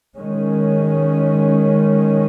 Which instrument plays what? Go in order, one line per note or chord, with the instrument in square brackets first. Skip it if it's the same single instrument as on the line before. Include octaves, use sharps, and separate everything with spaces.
[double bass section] D#3 G#3 C#4